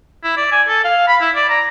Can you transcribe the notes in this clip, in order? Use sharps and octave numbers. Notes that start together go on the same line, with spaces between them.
E4
D5
G#5
A4
F5
B5
E4
D5
A#5